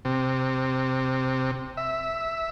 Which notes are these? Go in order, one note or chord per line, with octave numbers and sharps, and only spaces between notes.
C3
E5